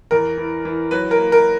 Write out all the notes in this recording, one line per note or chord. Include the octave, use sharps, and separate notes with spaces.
E2 A#4
E3
E3
F#3 B4
A#4
A#3
A#4